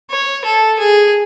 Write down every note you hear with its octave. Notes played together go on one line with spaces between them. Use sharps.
C#5
A4
G#4